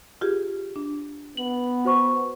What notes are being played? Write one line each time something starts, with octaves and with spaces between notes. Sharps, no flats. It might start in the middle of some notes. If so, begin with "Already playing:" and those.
F4 G4 G#4
D4
B3 F#7
F#4 C5 C#6